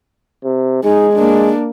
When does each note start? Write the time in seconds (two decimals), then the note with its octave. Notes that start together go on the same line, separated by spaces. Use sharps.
0.45 C3
0.84 G#3 D#4 G#4
1.14 A#3 D4